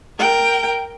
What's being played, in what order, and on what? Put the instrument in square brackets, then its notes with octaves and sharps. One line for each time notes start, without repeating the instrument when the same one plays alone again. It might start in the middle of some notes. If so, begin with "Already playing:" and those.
[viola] A#4 G5